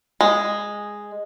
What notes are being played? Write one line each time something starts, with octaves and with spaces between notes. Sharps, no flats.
G#3